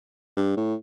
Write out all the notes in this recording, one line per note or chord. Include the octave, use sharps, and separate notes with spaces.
G2
A2